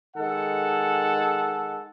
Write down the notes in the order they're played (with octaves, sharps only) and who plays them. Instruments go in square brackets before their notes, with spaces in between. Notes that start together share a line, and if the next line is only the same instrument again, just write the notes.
[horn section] D#3 G#3 A4 F#5